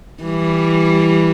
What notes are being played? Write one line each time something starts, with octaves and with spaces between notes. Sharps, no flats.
E3 G3